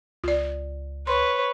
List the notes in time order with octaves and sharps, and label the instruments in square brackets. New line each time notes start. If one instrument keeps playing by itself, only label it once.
[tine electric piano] C#2 [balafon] F4 D5
[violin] B4 C#5 [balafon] C6